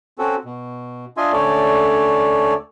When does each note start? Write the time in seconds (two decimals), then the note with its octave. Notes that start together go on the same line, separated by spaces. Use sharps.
0.19 C4 C#4 F#4 A4
0.45 B2
1.17 D4 F4 D#5 E5 G#5 C6
1.33 D2 A3 C#4 A4 C#5 D5